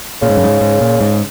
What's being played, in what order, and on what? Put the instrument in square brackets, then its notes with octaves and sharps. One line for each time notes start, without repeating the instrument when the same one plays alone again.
[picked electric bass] A#2 [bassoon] C#3
[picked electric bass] G#2
F#2
G#2
G#2
A#2
G#2